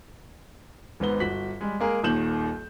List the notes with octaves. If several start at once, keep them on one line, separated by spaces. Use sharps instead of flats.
G#1 G#2 B3 G7
G1 F#4 B6 F#7
G3 G#3
G#3 A#3 G#4 A#4
D#1 D#2 D#3 G6 E7 F#7